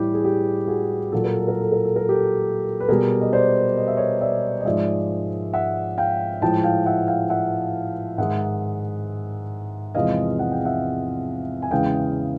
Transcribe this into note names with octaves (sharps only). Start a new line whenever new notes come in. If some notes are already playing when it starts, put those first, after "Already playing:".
Already playing: A2 E3 G3 G4
G#4
G4
F#4 G#4
A#2 F#3 A4
A#4
A4
A#4
A4
A#4
A4
A#4
G4 A4
B4
B2 G3 G#4 A#4
D#5
C5 D5
D#5
E5
C#5 D#5
D5 E5
D#5
G#2 F3 G#3 D5 E5
E5 F#5
F5 G5
A2 F3 G#3 G5 A5
F5 G5
E5 F#5
F5 G5
E5 F#5
G#2 D#3 G#3 E5 F#5
E2 C3 F3 G#3 D#5 F5
F#5
G5
E5 F#5
G#5
E2 C#3 E3 G#3 F5 G5